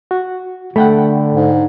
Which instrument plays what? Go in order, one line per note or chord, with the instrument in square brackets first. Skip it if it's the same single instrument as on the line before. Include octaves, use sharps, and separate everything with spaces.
[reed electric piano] F#4
[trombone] D3 [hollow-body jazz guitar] A3 [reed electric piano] F#5 G5 B5
[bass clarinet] G#2